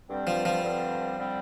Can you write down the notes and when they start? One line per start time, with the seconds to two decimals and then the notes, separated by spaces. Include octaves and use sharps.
0.09 G2 D3 G3 C4
0.27 F3
0.45 F3
0.63 G2 D3 G3 C4
1.18 D3 G3 C4